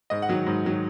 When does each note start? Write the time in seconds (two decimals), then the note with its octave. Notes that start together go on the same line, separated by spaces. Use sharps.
0.10 G#2 D#5
0.22 F#5
0.29 D#3 F#3
0.46 G#2
0.65 D#3 F#3